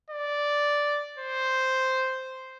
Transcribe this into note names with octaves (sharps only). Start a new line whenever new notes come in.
D5
C5